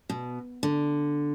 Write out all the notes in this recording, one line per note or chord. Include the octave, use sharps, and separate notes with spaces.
B2
D3